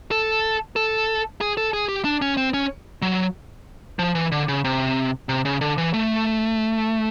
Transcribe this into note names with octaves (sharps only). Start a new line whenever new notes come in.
A4
A4
G#4
A4
G#4
G4
D4
C#4
C4
C#4
F#3
F3
E3
D3
C#3
C3
C3
C#3
D3
E3
A3